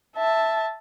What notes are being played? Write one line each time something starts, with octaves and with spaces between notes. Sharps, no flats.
E5 A5